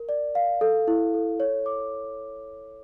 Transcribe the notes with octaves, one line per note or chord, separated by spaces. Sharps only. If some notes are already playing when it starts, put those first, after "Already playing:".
Already playing: A#4
D5
F5
A4
E4
A4
C#5
D6